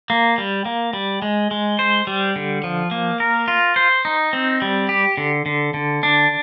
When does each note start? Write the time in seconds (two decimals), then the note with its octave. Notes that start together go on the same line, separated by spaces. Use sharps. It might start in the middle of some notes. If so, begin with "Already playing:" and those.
0.10 A#3
0.38 G3
0.65 A#3
0.93 G3
1.22 G#3
1.51 G#3
1.79 C5
2.07 G3
2.36 D3
2.64 F3
2.91 A#3
3.20 A#4
3.48 F4
3.76 C5
4.05 D#4
4.33 C4
4.62 G3
4.89 G4
5.17 D3
5.46 D3
5.74 D3
6.03 D4